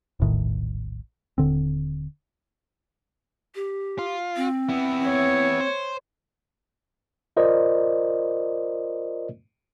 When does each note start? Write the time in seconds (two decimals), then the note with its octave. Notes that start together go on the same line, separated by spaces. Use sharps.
0.20 E1 A#1 A2 D#3
1.38 D#1 D3 C4
3.55 G4
3.99 F4
4.36 C4
4.69 B3 E4
5.06 C#5
5.60 C5
7.37 F4 A#4 C5 D5 D#5